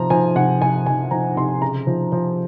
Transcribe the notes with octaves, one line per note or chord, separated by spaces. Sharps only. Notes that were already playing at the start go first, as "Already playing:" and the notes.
Already playing: C3 F3 A#5
F3 G#5
C3 F#5
C3 G#5
F3 G#5
F3 A#5
C3 C6
C#3 A#5
F3
F3